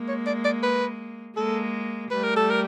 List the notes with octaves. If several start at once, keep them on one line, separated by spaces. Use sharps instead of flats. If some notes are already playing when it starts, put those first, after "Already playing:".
Already playing: G#3 A#3
C#5
D5
D5
B4
G#3 A#3 A4
G3 A3 B4
A#4
A4
A#4